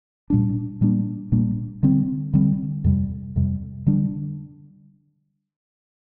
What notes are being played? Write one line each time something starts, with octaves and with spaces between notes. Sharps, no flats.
A#2 G3 D4
A#2 G3 A#3 D4
A#2 G3 A#3 D4
D3 G3 C4
D3 G3 C4
F2 C3 G3
F2 C3 G3
D3 G3 D4